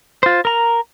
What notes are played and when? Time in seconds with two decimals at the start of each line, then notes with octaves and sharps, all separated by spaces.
0.23 F4 C5
0.45 A#4 A#5